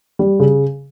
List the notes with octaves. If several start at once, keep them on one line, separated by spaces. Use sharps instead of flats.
G3
C#3